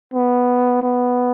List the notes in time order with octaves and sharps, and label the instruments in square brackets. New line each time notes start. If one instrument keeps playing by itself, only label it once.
[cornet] B3
B3